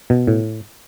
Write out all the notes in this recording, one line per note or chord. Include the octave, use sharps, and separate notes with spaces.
B2
A2